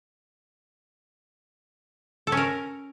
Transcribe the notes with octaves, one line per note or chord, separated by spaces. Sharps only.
A4
C#4
A#4